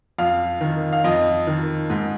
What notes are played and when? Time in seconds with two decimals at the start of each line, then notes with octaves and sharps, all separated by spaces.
0.18 F2 F5
0.61 D#3
0.93 F5
1.04 F2 D#5
1.47 D#3
1.90 G#2